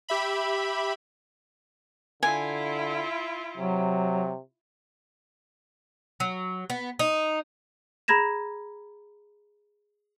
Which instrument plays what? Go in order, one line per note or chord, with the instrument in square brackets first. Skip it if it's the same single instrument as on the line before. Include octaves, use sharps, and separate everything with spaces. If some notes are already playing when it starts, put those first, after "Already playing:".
[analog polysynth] G4 E5 B5
[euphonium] D3 [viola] E4 F4 [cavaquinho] G#5
[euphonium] C3 [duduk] F#3
[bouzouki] F#3
B3
D#4
[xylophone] G#4 A#5 B5 G#6 A#6 E7